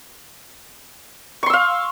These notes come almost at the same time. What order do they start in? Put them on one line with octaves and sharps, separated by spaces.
C#6 C6 E6 F5